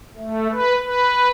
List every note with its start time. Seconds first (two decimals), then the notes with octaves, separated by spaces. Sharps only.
0.17 A3
0.52 B4
0.83 B4